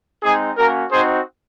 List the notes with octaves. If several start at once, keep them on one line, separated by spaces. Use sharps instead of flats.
G#3 C4 D#4 G#4
A#3 C#4 F#4 A#4
C4 D#4 F#4 G#4 C5